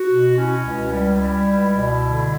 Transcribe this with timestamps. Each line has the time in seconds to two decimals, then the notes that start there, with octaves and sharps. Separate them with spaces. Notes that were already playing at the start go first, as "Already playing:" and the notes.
Already playing: F#4
0.09 B2
0.37 C#4 E4
0.65 C#2
0.92 G3
1.20 G3
1.47 C#2
1.75 B2
2.03 D3